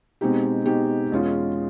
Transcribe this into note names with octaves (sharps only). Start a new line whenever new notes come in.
B2 G#3 C4 D#4 G4
B2 G#3 C4 D#4 G4
E2 B2 G#3 C#4 F4